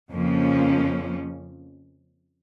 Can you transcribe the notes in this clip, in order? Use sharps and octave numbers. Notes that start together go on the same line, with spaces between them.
F2 C#3 F3 A#3 C#4